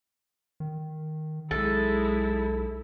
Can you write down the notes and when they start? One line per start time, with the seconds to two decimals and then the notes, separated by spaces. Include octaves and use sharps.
0.60 D#3
1.51 B1 G#3 E4 A4